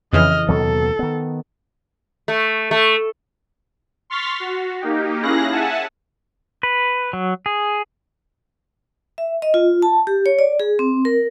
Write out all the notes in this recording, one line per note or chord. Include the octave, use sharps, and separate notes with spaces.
F2 C#3 E3 D#5 F6
D#2 B2 F#3 A4
D#3 B3
A3
A3
C6 C#6 F6 A6 B6
F#4
A#3 D#4 G4
C#4 E4 G#4 F5 F#6 A#6
E5 F#5 G#5 A5
B4
F#3
G#4
E5
D#5
F4
A5
G4
C#5
D5
G#4
C4
A#4